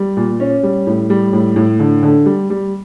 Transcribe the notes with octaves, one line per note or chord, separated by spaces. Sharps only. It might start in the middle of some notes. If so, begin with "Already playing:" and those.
Already playing: G3
A#2
C#4
G3
A2
G3
A2
A2
D3
D3
G3
G3